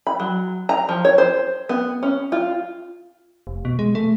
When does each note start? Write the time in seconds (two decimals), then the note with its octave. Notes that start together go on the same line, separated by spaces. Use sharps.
0.07 B5
0.20 F#3
0.69 A#5
0.89 F3
1.05 C#5
1.18 C5
1.69 B3
2.03 C#4
2.32 F4
3.47 F1
3.65 B2
3.79 G#3
3.95 A3